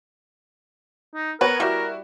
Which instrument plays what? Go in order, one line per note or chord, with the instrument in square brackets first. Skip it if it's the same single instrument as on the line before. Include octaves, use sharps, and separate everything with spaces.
[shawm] D#4
[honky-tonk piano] B3 C#5 F#5 [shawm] A#4 [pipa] B4
[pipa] G3 [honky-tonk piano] E4 F#4 [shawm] A#4